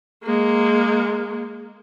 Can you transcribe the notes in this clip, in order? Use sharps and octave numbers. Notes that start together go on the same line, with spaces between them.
G#3 A#3